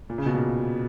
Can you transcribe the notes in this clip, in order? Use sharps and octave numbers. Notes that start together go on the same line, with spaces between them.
A#2
C#3
B2
A#2